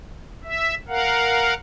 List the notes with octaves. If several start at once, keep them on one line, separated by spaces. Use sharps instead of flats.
E5
A#4 F5 F#5